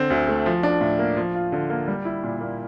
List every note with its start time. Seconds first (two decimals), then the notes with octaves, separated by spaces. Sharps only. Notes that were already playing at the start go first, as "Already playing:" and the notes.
Already playing: D3 C4
0.10 D2
0.28 A3
0.46 F3
0.63 D4
0.81 A2
0.99 A#3
1.17 F3
1.35 F4
1.52 D3
1.70 A#3
1.88 G3
2.05 E4
2.23 A#2
2.41 A#3